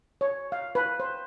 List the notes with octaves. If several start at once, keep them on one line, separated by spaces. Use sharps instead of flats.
C#5
F5
B4
C5